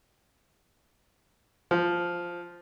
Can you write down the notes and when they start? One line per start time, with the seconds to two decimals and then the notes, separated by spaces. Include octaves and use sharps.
1.71 F3